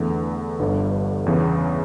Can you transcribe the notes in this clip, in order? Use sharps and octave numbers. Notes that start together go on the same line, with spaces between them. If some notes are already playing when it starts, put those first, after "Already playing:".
Already playing: E2 D3 A3
G1 G2 D3 G3
E2 C#3 E3